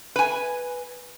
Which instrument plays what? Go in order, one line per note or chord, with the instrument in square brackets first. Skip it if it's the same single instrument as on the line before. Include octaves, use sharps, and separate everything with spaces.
[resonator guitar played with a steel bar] B4 G#5